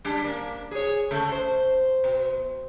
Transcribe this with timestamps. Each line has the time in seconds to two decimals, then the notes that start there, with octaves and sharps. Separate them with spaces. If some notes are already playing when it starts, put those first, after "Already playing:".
0.05 G3 D4
0.24 A#3 D4
0.71 G#4 C#5
1.11 C#3 A3
1.32 C5
2.04 B2